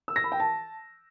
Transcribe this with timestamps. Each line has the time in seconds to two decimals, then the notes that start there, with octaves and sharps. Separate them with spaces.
0.08 E6
0.16 A#6
0.24 B5
0.32 G5
0.40 A5